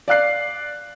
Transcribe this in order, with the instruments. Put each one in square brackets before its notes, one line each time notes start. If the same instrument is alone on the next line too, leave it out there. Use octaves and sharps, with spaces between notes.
[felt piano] D5 F5 F#6 C7